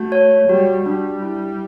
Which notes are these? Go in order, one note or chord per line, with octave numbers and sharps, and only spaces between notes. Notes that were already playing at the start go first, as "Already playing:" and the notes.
Already playing: A3 F#4
C#5
G3 F#4
G3 D4
E4